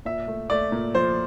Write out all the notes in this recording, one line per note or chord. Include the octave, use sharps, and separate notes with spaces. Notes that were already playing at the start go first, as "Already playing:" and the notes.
A#2 E5
A3
A3 D5
A#2
F3 C5